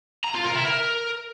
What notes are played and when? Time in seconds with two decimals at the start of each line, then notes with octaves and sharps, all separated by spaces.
0.24 A#5
0.34 F4
0.44 A#4
0.55 E4
0.65 A#4